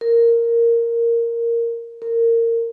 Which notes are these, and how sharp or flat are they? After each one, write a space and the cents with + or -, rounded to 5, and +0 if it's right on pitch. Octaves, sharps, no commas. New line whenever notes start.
A#4 -5
A#4 -20